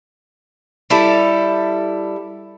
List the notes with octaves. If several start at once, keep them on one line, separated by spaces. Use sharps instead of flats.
G3 E4 A4